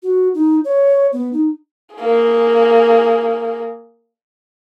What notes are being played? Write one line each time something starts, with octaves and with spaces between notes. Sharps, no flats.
F#4
D#4
C#5
B3
D#4
A#3 G#4